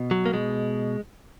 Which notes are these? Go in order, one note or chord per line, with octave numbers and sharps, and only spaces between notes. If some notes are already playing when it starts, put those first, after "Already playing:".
Already playing: B2
F#3
A#3
B2 G#3